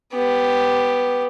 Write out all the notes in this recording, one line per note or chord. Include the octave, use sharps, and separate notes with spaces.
B3 G4